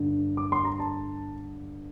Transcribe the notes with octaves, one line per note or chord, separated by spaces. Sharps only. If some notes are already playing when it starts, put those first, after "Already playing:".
Already playing: G1 G2 D3
D6
C6
A#5
A5